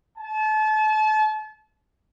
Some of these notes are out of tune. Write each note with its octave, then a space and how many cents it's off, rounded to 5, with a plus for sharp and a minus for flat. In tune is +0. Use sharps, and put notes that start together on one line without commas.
A5 -35